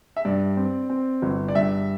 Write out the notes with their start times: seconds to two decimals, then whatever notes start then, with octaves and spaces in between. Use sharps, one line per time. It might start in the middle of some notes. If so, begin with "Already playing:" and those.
0.16 E5
0.25 G2 D5
0.57 C4
0.90 C4
1.22 G1
1.48 D5
1.55 G2 E5